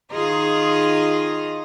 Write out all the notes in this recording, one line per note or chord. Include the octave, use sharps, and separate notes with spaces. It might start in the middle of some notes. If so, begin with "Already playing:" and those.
D#3 F4 G#4 D#5 A#5